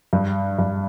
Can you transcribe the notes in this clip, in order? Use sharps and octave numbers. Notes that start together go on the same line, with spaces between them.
G2
G2